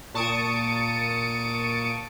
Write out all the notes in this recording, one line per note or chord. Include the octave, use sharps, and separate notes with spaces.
A#2 A5 C#6 D#6 C#7 D7